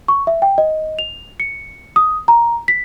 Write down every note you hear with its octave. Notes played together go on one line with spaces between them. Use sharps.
C#6
E5
G5
D#5
F7
C#7
D#6
A#5
B6